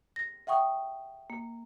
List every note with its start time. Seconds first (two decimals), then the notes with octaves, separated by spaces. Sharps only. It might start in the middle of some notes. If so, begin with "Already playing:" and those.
0.16 A#6
0.47 E5 F#5 G5 C#6 D#6
1.30 A#3